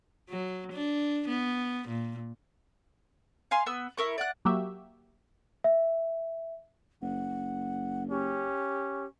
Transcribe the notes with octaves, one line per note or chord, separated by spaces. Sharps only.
F#3
D4
B3
A#2
F5 G#5 C6
B3 E6
E4 A#4 C#6
D5 F#5 F#6
F#3 A#3 F#4 G4 E5
E5
F#1 F#5
C#4 G4